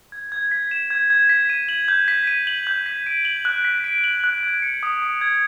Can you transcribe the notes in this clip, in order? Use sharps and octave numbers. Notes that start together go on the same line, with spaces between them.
G#6
G#6
B6
E7
G#6
G#6
B6
D#7
F#7
G6
B6
D#7
F#7
G6
B6
D7
F#7
F#6
B6
D7
F#7
F#6
G#6
C#7
D#6
D#6
G#6